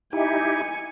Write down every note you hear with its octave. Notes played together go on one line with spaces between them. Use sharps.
D#4 E4 G4 G#5 C#7